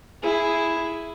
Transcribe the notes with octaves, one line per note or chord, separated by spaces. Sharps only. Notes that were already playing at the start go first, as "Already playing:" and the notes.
E4 G#4